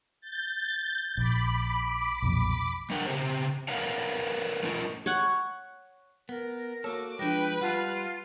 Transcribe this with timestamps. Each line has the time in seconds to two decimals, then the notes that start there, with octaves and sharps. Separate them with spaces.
0.21 G6 A6
1.17 A#1 B5 D6
2.22 B1 F2 A#2
2.90 G3 A3 D4 A#4 F#5 G5
3.06 C#3 C4 G4 C5
3.68 A#4 B4 C#5 F5 F#5
4.63 A3 C#4 E4 F4 A#4 D#5
5.06 C#5 F#5
6.29 B3 A#4
6.84 A#3 F#4 A4 C#5 D6
7.19 F3 G#3 D4 B4 G5 A#6
7.61 G3 F4 F#5 A5